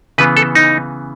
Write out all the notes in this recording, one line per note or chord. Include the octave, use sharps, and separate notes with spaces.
C#3 E3 B3 B4
A4
D#4